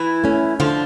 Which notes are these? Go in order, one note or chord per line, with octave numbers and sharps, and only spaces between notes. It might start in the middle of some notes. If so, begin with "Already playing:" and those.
Already playing: E3 E4
A3 C#4
D3 F3 F4